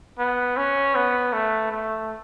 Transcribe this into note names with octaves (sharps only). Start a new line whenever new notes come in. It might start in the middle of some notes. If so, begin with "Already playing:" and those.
B3
C#4
B3
A3
A3